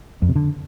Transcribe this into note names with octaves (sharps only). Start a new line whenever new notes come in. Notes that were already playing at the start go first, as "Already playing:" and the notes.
F2
C3
D3